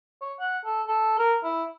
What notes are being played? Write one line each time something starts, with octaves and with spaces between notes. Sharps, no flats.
C#5
F#5
A4
A4
A#4
E4